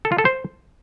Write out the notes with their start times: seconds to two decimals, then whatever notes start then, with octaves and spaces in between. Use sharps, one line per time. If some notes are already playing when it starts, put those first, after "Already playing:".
0.05 A4
0.12 F4
0.18 A4
0.25 C5